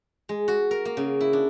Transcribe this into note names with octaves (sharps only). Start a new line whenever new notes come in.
G#3
F#4
A#4
A#3
C#3
E4
D4